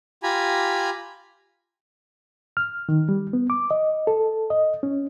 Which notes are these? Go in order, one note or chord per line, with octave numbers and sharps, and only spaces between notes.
F4 G4 G#5 A#5 B5
F6
D#3
G3
B3
D6
D#5
A4
D#5
C#4